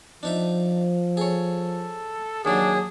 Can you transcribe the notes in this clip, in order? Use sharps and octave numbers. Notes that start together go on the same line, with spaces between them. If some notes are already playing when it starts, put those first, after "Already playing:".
F3 D4 D#4 E5
G#4 A4 C#5
D#2 F#3 D4 G#4